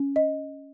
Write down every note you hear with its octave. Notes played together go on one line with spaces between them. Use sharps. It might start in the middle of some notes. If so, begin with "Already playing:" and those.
Already playing: C#4
D#5